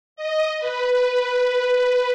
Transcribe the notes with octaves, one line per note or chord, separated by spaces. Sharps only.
D#5
B4